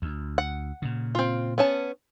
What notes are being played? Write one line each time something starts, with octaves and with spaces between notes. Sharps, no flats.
D2
F#5
A#2 C#3
C4 F4
B3 C#4 A5